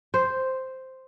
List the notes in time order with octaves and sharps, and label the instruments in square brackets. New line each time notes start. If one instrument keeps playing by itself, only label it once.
[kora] C5